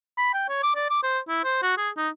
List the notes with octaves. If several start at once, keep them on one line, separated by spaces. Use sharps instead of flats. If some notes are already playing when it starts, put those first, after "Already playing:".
B5
G5
C#5
D6
D5
D6
C5
E4
C5
F#4
G#4
D#4